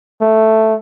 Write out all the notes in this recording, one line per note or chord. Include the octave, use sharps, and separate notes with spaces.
A3